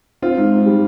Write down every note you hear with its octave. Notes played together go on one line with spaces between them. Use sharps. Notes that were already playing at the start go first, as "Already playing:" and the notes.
C4 F4
G#2
G#2
G3